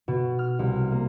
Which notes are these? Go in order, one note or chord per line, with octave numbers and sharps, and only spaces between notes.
B2
F6
C2
F6
A#3